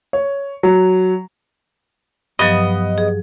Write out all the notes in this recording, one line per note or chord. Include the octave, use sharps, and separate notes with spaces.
C#5
F#3
G2 F3 F#3 B3 D#5
G#4